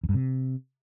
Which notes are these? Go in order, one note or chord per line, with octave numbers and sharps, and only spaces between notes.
E2
G2
C3